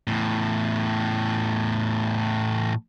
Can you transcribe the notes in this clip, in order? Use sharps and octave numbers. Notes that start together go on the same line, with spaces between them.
E2 A2